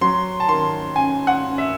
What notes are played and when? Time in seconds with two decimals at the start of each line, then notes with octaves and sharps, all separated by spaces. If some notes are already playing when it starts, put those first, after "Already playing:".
0.01 F#3 C6
0.40 A5
0.48 D#3 C6
0.95 C#4 G#5
1.27 F#5
1.43 C#4
1.58 E5